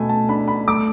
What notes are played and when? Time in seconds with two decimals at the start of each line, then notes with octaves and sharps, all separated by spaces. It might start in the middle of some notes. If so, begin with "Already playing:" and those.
Already playing: B2 A3 G#5 B5
0.09 A5
0.29 D4 B5
0.48 B5
0.68 A3 D6